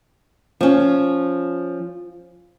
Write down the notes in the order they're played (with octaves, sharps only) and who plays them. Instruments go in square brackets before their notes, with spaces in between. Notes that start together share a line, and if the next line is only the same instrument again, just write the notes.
[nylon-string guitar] F3 C#4